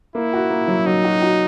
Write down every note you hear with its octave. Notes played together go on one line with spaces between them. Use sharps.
A#3 E4
F#4
A#3
F#3
F#3 D#4
F#4
F#4